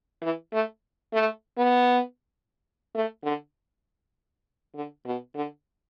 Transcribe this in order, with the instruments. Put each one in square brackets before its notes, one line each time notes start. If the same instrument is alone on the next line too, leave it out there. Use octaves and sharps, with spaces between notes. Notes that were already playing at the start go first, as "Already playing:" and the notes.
[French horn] E3
A3
A3
B3
A3
D3
D3
B2
D3